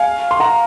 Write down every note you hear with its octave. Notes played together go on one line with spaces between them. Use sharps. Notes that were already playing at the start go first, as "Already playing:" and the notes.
Already playing: F5 G#5
C6
F#5 A#5